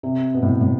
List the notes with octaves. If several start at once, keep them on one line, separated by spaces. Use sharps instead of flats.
C3
B2
A2
A2